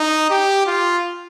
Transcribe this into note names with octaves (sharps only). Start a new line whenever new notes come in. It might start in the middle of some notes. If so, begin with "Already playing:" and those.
Already playing: D#4
G4
F4